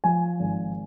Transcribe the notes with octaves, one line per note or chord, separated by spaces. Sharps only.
F3 G#5
G#1